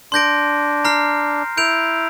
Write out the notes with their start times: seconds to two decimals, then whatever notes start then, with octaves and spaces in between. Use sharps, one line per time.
0.12 D4 C6 G6 A#6 D7
0.85 A#5 F6 C7
1.57 E4 G6 D7 F7